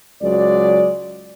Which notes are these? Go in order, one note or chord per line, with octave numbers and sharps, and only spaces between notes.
C#2 F#3 G#3 D5